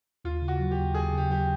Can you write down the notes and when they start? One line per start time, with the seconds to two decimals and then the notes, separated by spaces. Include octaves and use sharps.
0.25 D#2 F4
0.42 C#3
0.48 F#4
0.59 F#3
0.71 G4
0.77 D#2
0.94 D#2 G#4
1.12 C#3 G4
1.30 F#3 G4